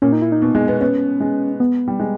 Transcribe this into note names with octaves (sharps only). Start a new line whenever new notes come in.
A#2 C#4
D#4
E4
D#4
B2
G#3
B3
B3 C#4
G#3
B3
G3
G#3